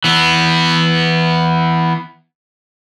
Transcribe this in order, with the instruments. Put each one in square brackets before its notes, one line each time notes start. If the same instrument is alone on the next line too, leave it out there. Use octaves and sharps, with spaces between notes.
[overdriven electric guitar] E3 B3